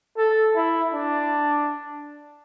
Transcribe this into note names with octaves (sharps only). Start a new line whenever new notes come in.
A4
E4
D4